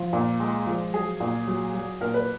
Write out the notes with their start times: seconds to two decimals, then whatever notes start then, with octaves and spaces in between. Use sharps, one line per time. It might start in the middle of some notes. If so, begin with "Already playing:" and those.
Already playing: F3
0.13 A#2
0.40 G#3
0.67 F3
0.94 F#3 G#4
1.20 A#2
1.47 F#3
1.74 F#3
2.01 A#2 A#4
2.14 B4